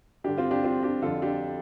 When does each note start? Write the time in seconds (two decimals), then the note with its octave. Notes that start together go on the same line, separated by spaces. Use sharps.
0.24 G2 D3 D4 G4
0.38 C4 F4
0.51 D4 G4
0.64 C4 F4
0.83 D4 G4
1.02 F2 D3 F4 A4
1.22 D4 G4